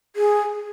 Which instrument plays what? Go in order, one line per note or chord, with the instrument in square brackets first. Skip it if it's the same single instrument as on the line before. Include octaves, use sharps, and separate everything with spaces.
[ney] G#4